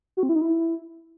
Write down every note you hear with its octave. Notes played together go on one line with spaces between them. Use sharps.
F#4
C4
E4
D#4
E4